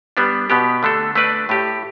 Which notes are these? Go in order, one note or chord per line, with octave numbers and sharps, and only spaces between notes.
G3 B3 D4
B2 B3 G4
D3 A3 D4 A4
A3 D4 B4 D5
A2 A3 G4